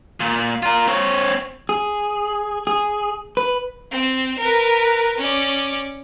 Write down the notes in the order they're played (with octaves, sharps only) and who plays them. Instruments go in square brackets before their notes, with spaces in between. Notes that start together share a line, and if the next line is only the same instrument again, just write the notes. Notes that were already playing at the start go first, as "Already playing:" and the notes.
[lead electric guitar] A#2
F4 A#4
C4 C#5
[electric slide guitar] G#4
G#4
B4
[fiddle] C4
A#4 B4
C#4 D5